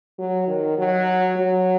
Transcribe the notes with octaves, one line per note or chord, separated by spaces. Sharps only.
F#3
D#3
F#3
F#3